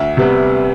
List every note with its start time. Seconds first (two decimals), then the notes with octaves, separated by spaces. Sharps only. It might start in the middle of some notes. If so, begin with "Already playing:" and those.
Already playing: D2 E5
0.17 C3 G3 B3